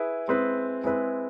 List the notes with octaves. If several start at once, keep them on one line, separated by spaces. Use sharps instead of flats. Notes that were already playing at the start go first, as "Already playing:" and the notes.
Already playing: E4 G#4 B4
G#3 C4 E4 G#4 B4
G#3 C4 E4 G#4 B4